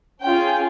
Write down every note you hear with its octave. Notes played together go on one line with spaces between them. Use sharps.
C#4 F4 G#4 G5